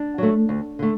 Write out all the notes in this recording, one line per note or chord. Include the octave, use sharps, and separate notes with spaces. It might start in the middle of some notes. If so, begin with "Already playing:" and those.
Already playing: D4
F#3 A3
D2
D3 A3